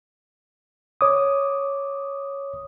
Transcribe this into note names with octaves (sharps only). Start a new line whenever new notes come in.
C#5 D6 D#6